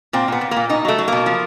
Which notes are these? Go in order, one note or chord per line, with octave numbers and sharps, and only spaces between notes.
A#2 C4
A#2
B3
A#2
A#3
A#2
B2 D#4
F#3 A3
F#3
B2 A#3
F3